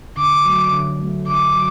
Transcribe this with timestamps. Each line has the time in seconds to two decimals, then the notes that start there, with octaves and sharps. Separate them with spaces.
0.17 D3 D6
0.46 F#3 A3
0.72 D3
1.00 F#3 A3
1.27 D3 D6
1.55 F#3